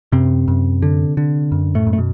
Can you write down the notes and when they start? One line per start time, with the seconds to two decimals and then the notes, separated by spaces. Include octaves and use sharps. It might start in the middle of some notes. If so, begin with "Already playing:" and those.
0.12 F#2 C3 C4
0.48 F#2
0.82 D3
1.17 D3
1.52 F#2
1.75 A2 A3
1.87 F#2
1.93 A3
1.98 B2